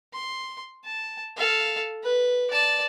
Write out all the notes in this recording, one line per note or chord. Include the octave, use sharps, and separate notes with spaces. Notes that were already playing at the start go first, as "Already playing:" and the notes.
C6
A5
A4 F5
B4
D5 A5